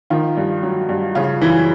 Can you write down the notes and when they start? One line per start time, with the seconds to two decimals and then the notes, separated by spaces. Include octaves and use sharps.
0.10 D#3 F3 F4
0.37 G2
0.63 F#3
0.89 G2
1.15 C#3 F3 F4
1.41 F#2 E3 E4